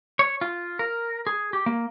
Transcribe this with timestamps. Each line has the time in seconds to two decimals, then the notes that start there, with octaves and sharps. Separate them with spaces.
0.19 C#5
0.41 F4
0.79 A#4
1.27 G#4
1.53 G4
1.66 A#3